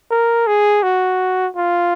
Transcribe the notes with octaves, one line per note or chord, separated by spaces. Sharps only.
A#4
G#4
F#4
F4